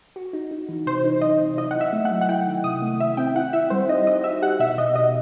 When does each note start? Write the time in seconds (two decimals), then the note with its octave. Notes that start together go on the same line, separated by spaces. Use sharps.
0.16 F#4
0.33 D#4
0.51 D#4
0.69 E3
0.86 C3 C5
1.04 D#4
1.21 F#3 D#5
1.40 C3
1.58 E4 D#5
1.71 E4 F#5
1.81 E5
1.93 A3
2.05 F#5
2.11 F#3
2.21 F#5
2.29 E4 G5
2.47 D#3
2.64 C3 D#6
2.82 A3
3.00 E4 E5
3.17 C4 G5
3.35 E4 F#5
3.53 E4 E5
3.70 G3 C5
3.89 D#4 D#5
4.07 D#4 D#5
4.24 F#4 E5
4.42 G4 F#5
4.60 B2 E5
4.78 B2 D#5
4.95 B2 D#5